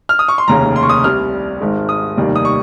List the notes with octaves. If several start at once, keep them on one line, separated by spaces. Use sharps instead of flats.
F6
D#6
C#6
C6
F1 D#2 C#3 A#5
C6
C#6
D#6
C2 C3 G3 F6
G#1 G#2 D#3 G#3
D#6
F1 D#2 D#3 G3
D#6
C#6